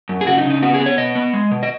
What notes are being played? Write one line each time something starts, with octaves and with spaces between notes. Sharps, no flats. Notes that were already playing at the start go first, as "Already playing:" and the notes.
F#2
G#4
C#3 F#4
D#4
C#3
D#4
B3 F#4
G#4
B3
C#5
B2 D#5
B3
G#3
B2
D#5